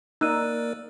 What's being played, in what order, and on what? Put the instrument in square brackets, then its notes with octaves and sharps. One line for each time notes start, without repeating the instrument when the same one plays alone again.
[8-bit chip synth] A#3 A#4 D5 [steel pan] D#4 [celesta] E6 F#6 D#7